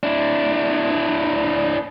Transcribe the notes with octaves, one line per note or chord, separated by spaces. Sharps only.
D4 E4